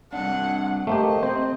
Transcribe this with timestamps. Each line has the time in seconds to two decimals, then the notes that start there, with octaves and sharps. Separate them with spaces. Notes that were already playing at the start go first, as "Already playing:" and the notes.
0.13 G2 C3 D4 F#5
0.87 A3 A#3 G4 C5 D#5
1.23 C4 C5